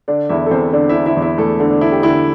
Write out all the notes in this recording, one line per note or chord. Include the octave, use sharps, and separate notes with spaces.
D3 D4 D5
E2 E4 E5
A4
E2 C4 C5
D3 D4 D5
E4 E5
D3
E4 E5
E2
E4 E5
E2 A3 A4
D3
D4
D3 E4
G4
D3 E4